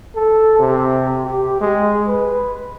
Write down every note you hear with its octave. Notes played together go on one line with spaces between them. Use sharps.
A4
C3
G4
G#3
B4